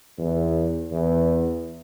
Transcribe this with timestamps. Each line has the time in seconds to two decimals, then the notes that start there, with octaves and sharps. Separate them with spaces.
0.18 E2
0.91 E2